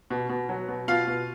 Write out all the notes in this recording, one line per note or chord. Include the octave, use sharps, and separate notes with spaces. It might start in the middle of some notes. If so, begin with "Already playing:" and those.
B2
B2
F#3
B2
B2 F4 F5
B2